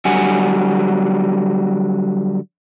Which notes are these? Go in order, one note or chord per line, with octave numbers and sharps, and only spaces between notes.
D3 F#3 G3 F#5 G#5